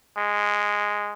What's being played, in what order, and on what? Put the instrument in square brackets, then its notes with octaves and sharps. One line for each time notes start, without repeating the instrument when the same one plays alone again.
[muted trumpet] G#3